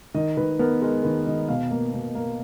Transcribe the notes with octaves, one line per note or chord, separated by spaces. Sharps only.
D#3 D#5
D#3 B4
B3 A#4
G#3 A#4
D#3 B4
D#3 D#5
B2 F5
A#3
B2
A#3